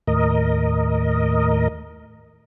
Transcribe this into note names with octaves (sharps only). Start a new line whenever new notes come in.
D#2 A2 A#4 D#5